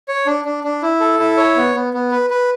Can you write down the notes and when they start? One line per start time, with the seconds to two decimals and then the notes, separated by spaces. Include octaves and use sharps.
0.08 C#5
0.26 D4
0.45 D4
0.64 D4
0.82 E4
1.00 A4
1.19 E4
1.37 C#5
1.56 B3
1.75 B3
1.94 B3
2.11 B4
2.30 B4